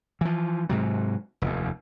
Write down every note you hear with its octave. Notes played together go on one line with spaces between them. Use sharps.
E3 F3
G#2 C3 F#3
F1 D#2